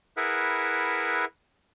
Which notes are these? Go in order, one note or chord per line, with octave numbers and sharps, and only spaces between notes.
E4 G#4 A#4 B4 E5 F#5